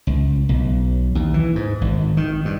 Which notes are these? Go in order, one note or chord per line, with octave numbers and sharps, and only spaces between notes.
C#2
B1
D#2
E3
G#2
G#1
D#3
G2